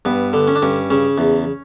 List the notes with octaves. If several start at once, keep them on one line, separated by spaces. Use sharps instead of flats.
G2 B3
D3
C#4
D4
G2 C#4
C#3 C#4
E2